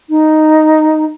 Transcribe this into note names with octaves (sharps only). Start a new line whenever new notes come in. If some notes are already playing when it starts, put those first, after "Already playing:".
D#4